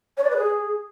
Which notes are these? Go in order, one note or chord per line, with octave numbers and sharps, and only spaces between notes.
C#5
D5
B4
G#4